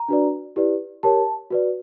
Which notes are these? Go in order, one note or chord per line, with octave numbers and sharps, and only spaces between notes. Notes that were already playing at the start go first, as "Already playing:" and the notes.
Already playing: A#5
D4 F#4 B4 D5
E4 G4 B4 D5
G4 A#4 C#5 A5
F#4 B4 D5